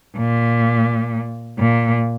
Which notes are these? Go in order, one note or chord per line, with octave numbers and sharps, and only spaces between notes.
A#2
A#2